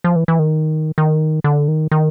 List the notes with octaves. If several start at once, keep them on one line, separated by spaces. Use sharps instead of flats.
F3
E3
E3
D#3
D#3
D3
D#3
D#3